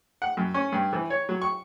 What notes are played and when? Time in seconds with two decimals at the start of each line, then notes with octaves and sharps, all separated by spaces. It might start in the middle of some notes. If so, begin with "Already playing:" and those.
0.22 F#5
0.37 F#2
0.54 C#4
0.72 G2
0.93 E3
1.10 C#5
1.29 F#3
1.42 C#6